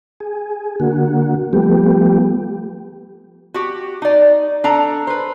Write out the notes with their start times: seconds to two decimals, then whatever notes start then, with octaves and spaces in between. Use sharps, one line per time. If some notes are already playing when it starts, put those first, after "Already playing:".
0.20 G#4
0.80 D3 A#3 F#4
1.53 F3 G3 A3 B3 G4
3.54 F#4 G4
4.02 D#4 D5
4.64 D4 A4 A#5
5.07 B4 C5